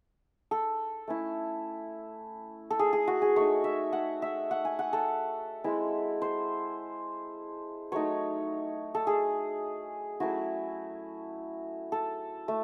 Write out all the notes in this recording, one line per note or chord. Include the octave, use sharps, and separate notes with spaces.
A4
A3 C#4 E4
A4
G#4
G#4
F#4
G#4
A3 D#4 C#5
E5
F#5
E5
F#5
G#5
F#5
A4
G#3 C4 E4
C5
F#3 A3 D#4 C#5
A4
G#4
F#3 A3 C#4 E4 F#4
A4
A3